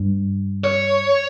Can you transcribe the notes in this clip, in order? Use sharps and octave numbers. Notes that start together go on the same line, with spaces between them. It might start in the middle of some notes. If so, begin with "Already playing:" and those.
Already playing: G2
C#5